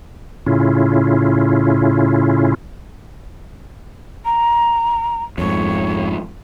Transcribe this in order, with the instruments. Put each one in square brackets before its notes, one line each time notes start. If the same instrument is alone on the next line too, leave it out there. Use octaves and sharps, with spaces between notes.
[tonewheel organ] A2 C#3 C#4 E4 F4
[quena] A#5
[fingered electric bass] F2 G#2 [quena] C#5